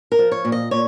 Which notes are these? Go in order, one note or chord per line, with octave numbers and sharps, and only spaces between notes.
A#4
F3
C#5
A#2
D#5
A#2 C#5